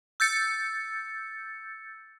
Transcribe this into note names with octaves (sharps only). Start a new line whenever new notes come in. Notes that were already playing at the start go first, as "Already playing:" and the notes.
E6 G6 A6 C#7